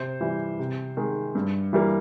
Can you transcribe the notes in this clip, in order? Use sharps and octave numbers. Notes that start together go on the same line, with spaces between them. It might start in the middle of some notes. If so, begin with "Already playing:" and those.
Already playing: C3 C5
E3 G3
C3
D#3 G#3
G2
E3 G3 A#3